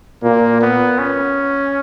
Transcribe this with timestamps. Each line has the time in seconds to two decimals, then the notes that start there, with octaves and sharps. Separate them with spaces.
0.23 A#2 A#3
0.61 B3
0.99 C#4